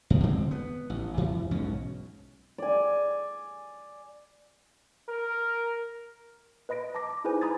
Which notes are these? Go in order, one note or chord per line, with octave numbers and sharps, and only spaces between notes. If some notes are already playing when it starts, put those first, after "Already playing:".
E2 A2
D3 G#3 C4
B3
A1
F2 E3
B1 G#2 B2 C#4
D5 G#5
A#4
B4 D#5 B5 A#6 D7
A5 A#5 D6 A#6
D6
D#4 E4 G#4 B4 C5 G#5
G#5 A#5 B5 D#6 G#6 A6